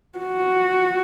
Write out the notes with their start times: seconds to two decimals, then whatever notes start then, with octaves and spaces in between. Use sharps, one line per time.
0.19 F#4